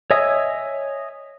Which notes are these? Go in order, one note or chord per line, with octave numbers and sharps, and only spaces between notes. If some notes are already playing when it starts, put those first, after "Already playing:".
C#5 D#5 E5 G#5 D#6